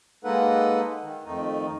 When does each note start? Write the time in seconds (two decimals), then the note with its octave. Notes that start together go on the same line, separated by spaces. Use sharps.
0.24 G#3 A#3 D#4 A4 B4 F#5
1.03 D#3
1.25 F2 D#3 A3 D#4